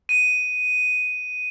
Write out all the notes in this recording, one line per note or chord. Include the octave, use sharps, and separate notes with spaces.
D#7